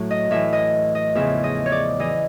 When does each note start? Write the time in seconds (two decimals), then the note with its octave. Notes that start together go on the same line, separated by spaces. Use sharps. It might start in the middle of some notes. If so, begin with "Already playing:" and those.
Already playing: A2 F#3
0.11 D#5
0.31 A2 E3 E5
0.53 D#5
0.95 D#5
1.15 E2 C#3 F3 E5
1.44 D#5
1.66 C#5
1.72 D5
2.00 E3 D#5